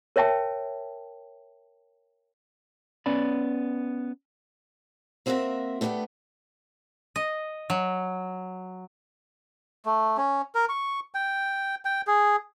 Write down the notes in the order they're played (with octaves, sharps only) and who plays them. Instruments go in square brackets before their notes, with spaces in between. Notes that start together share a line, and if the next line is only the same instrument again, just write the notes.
[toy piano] A#4 C#5 E5 G5 A5
[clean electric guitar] B3 C#4 D5 B5
[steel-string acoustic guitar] A#3 C4 F#4 G4 A#4 E5
A3 B3 D4 F#4 G4
[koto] D#5
F#3
[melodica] A3
C#4
A#4
C#6
G5
G5
G#4